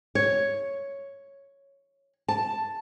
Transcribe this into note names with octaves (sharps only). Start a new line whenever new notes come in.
C#5
A5